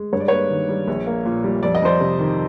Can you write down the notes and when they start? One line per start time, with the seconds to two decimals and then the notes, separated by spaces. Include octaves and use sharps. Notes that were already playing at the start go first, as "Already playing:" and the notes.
Already playing: G#3
0.13 G2 C#5
0.20 D5
0.28 A#3 B4 C#5
0.50 D#3
0.69 G3
0.88 A#1
1.07 A#3
1.25 A#2
1.44 G3
1.63 F2 D5
1.75 D#5
1.82 F2 C5 D5
2.01 C3
2.19 D#3